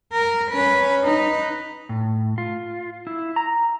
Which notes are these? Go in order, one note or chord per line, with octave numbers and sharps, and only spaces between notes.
A#4
C#4 B4
D#4 B4
A2
F4
E4
A#5